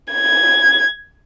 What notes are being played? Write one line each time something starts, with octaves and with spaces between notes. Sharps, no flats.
G#6